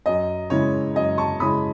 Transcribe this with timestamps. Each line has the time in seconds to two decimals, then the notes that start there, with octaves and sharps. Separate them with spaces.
0.06 F#2 D#5
0.50 C#3 G#3 C#4 E4 C#5
0.95 F#2 D#5
1.18 A5 C#6
1.40 C#3 G#3 C#4 E4 B5 D#6